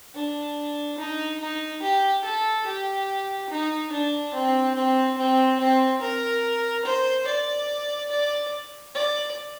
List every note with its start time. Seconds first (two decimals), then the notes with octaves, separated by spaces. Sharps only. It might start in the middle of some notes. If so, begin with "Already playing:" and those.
0.15 D4
0.98 D#4
1.41 D#4
1.82 G4
2.24 A4
2.66 G4
3.50 D#4
3.92 D4
4.34 C4
4.75 C4
5.18 C4
5.60 C4
6.02 A#4
6.85 C5
7.27 D5
8.11 D5
8.95 D5